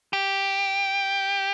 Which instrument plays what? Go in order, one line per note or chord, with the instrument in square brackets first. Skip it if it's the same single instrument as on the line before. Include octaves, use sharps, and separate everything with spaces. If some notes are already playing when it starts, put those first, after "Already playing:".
[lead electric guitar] G4